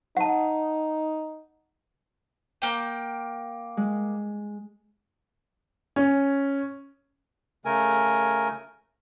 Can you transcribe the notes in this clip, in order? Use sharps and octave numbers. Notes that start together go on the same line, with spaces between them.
D#4 F#5 A5
A#3 G5
G#3
C#4
C#3 A3 A#4 G#5